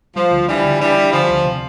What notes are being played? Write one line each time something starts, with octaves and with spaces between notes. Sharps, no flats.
F3 G3
D2
E3 G3 D4
D3
E3 G3 D4
D4
D3 F3
D2
C3